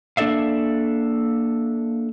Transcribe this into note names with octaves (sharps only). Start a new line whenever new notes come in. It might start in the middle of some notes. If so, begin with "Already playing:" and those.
A#3 D4 A4 D5 E5 F5